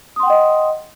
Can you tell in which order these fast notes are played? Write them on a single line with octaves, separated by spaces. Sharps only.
D#6 C6 F#5 G5 D#5